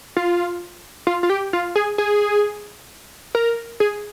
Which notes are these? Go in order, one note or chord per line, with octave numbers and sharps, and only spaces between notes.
F4
F4
F4
G4
F4
G#4
G#4
A#4
G#4